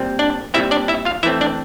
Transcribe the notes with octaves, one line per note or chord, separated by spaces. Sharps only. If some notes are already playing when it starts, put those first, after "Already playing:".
Already playing: A#2 G3 C4
D4 D5
A#2 G3 C4 E4 E5
D4 D5
E4 E5
F4 F5
E3 A3 C4 E4 E5
D4 D5